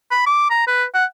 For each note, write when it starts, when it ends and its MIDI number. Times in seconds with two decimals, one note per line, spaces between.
0.11 0.22 83
0.26 0.49 86
0.50 0.64 82
0.67 0.84 71
0.94 1.05 78